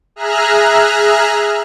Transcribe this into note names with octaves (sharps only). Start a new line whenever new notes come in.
G#4 E5 A#5 F6 F#6